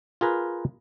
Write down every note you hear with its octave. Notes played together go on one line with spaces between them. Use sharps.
F4 G#4 A#4 B4